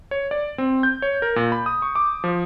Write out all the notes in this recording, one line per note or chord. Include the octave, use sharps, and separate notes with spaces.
C#5
D5
C4
G6
C#5
A#4
A#2
B5
D#6
C#6
D6
F3